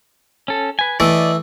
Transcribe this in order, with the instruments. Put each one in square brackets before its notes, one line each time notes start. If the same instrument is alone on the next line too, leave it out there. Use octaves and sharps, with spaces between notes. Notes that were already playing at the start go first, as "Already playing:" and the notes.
[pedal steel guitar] C#4 A4
B4 G#5
[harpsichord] E3 A3 [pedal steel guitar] D5 D#5